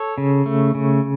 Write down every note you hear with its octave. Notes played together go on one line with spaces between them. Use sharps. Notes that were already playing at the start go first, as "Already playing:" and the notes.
Already playing: A4 C#5
C#3
A3
C#3